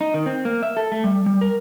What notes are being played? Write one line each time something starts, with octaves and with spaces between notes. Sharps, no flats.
D#4
D#3
C4
A#3
E5
A4
A3
G3
G3
A#4